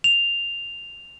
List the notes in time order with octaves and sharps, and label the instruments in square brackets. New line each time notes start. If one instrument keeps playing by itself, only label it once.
[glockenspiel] F7